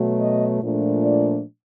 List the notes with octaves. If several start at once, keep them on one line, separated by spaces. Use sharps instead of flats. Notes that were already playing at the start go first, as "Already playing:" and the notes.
Already playing: B2 F#3 A3
D#5
A#2 F3 A3 D4
D5